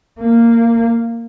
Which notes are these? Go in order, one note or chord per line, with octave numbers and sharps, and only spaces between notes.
A#3